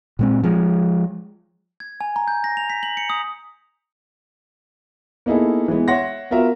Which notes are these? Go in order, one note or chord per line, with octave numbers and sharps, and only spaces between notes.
A#2 G#3 C4
F3 G#3
G#6
G#5
A#5
G6
A#6
F7
B6
F#7
C#7
D#6
A#3 B3 D#4 E4 G#4 A4
E3 G#3 B3
C#5 E5 F#5 C6 A#6
B3 F4 F#4 A#4 E5